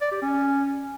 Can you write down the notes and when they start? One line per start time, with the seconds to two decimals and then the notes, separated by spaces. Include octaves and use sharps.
0.01 D5
0.12 G4
0.22 C#4